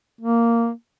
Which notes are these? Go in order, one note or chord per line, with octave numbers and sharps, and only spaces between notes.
A#3